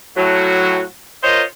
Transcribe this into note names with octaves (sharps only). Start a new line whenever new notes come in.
A2 F#3 F#4
F4 A#4 C5 C#5 D#5